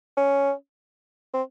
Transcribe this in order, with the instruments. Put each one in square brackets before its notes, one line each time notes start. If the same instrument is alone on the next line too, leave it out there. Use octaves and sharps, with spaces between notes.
[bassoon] C#4
C4